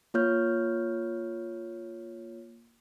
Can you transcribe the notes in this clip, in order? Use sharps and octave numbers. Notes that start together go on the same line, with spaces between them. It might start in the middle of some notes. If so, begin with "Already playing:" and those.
A#3 F4 C#5 F6 G6